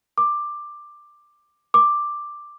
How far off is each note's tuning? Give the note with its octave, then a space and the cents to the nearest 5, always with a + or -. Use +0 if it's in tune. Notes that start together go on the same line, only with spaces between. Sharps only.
D6 +10
D6 +5